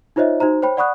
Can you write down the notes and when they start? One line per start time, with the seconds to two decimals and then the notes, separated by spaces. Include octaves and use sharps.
0.16 D#4 F4 C5 C#5 D#5 E5
0.40 D#4 F#4 C5 A#5
0.62 C5 C#5 G5 B5
0.77 D5 F#5 B5 C#6 D#6 F#6